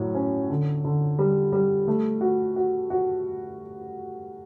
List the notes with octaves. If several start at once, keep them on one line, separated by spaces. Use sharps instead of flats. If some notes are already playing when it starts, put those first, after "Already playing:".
Already playing: A2 F#3
C#4
D3
D3
G3
G3
A3
F#4
F#4
F#4